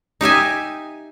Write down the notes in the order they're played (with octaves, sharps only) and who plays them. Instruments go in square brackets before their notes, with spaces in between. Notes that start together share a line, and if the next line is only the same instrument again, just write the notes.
[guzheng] D#4 G4 E5 G#5